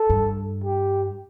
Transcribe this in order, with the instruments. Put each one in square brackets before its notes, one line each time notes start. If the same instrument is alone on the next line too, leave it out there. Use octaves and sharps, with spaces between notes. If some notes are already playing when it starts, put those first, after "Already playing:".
Already playing: [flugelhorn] A4
[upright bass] G2
[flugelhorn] G4